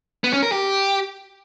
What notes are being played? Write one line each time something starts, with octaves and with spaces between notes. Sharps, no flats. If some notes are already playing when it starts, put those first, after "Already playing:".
B3
C#4
A#4
G4